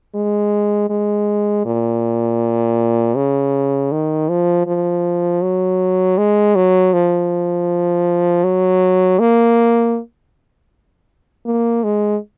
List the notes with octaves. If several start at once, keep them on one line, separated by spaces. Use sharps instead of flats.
G#3
G#3
A#2
C#3
D#3
F3
F3
F#3
G#3
F#3
F3
F#3
A#3
A#3
G#3